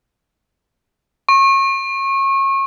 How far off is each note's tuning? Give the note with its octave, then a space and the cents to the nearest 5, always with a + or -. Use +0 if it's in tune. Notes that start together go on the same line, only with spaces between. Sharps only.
C#6 -30